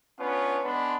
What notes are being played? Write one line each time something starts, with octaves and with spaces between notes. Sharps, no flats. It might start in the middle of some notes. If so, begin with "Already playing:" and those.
B3 C#4 D4 F4 B4
G#3 B3 D4 D5 B5 C6